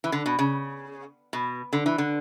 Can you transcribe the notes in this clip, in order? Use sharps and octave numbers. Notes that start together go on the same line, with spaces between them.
E3
D3
B2
C#3
B2
D3
E3
D3